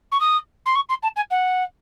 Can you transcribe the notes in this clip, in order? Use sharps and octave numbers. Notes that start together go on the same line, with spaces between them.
C#6
D#6
C6
C#6
C6
A5
G#5
F#5